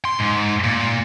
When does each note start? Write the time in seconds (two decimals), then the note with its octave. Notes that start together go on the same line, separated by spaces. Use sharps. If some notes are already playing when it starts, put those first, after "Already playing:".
0.05 C6
0.19 G#2
0.64 A#2